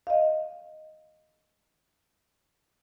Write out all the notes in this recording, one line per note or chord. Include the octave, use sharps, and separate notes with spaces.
D#5 F5